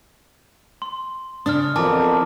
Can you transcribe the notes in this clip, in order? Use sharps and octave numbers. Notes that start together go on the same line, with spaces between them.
C6
C#3 D4 D#6 F6
F2 B2 E3 A#4 G#5 A5 D6